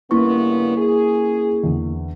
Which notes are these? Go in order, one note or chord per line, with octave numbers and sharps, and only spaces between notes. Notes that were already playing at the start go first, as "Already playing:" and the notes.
G2 C#3 A#3 B3 C#4 E4 C#6
G#4
E2 D3